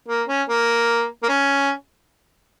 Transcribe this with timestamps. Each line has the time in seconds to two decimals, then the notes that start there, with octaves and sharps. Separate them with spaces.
0.09 A#3
0.28 C#4
0.49 A#3
1.23 A#3
1.29 C#4